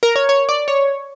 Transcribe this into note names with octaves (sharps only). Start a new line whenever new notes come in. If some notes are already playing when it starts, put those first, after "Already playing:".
A#4
C#5
C#5
D5
C#5